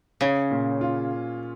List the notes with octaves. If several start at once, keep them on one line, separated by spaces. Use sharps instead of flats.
C#3 C#4
A#2
F4